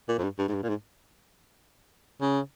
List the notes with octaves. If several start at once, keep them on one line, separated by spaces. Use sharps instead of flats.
A#2
F2
G2
G2
G#2
G2
A#2
G#2
C#3